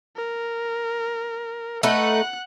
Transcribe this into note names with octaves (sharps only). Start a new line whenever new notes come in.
A#4
A3 D#4 B4 F#5 F#6